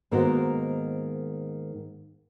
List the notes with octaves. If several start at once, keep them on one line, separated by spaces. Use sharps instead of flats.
G#2 D#3 A#3 B3 F#4 C5